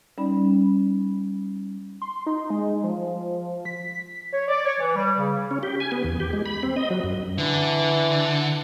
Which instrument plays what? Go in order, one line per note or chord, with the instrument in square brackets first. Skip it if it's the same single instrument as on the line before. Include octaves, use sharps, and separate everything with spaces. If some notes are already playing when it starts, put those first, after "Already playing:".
[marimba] G3 C#4 D#4 D5 B5
[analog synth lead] C6
D#4
G#3
F3
B6
[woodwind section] C#5
D5
C#5
E3
G3
C#3
[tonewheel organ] C#4
G4
G#5
B3
E2
G4
G#3
B5
C4
D#5
F#3
F#2
[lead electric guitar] D3 [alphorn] E3